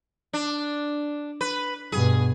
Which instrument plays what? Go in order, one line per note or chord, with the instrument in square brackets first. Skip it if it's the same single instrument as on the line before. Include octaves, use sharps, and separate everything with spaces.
[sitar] D4
B4
[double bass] G2 B2 [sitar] G#4